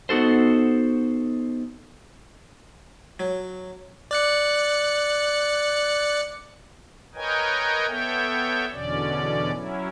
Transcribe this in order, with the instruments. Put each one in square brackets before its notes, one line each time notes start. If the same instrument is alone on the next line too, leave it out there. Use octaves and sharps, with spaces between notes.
[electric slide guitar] B3 D#4 F#4 A4 C5
[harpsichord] F#3
[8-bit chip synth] D5 F#6 C#7
[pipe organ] A#4 B4 C#5 D#5 G5 G#5
B3 A4 C#5 E5 G5
E2 B2 D3 C#4 D5
F#3 C#4 E4